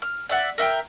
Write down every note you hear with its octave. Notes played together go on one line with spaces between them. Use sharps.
F6
D5 E5 F#5
A#4 E5 F#5 G5